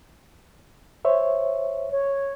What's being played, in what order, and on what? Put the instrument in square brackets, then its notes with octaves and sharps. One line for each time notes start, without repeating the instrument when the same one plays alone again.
[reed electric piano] C5 C#5 E5
[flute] C#5